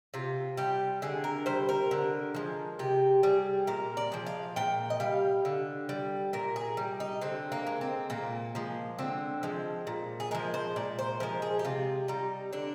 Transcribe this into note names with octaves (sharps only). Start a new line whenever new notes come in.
C3 F4
G3 G4
D3 G#4
A#4
G3 C5
A#4
D3
F3 G#3
C3 G4
G3 G#4
A#2 A#4
D5
F3 G#3
F5
A#2 G5
D#5
G3 F5
D3
G3
A#2 A#4
G#4
G3
D#4
D3 C4
A#3
G#3
C4
A#2 A#3
F3 G#3
D3 C4
F3 G#3
A#2
G#4
F3 G#3 A#4
C5
A#2 D5
C5
F3 G#3 A#4
G#4
G4
C3 F4
G3 D#4
D3 D4